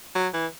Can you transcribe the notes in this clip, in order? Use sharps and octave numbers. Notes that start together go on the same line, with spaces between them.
F#3
E3